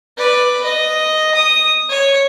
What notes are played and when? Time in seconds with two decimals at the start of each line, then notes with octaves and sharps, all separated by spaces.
0.17 B4 D5
0.64 D#5
1.35 D#6
1.89 C#5